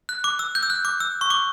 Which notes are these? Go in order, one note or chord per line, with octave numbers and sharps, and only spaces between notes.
F#6
D6
E6
G6
E6
F#6
D6
E6
C#6
D6